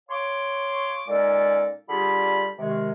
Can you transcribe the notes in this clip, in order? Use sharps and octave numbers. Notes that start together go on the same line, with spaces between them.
C#5 F5 C6 D6
A#2 G#3 C#4 D#4 A4 D5
D3 G3 F4 G4 G#4 B5
C3 D#3 G#3